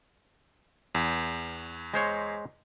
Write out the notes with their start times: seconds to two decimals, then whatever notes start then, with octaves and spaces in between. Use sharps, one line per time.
0.95 E2
1.94 G#3 C5 C#5